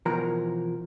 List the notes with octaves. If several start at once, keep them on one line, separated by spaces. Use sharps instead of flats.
B2 E3 F3 A#4 A#5